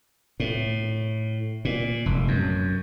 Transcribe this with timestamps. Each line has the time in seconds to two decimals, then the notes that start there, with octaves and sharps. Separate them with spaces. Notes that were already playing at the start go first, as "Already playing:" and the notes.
0.40 A2
1.65 A#2
2.06 F1
2.28 F#2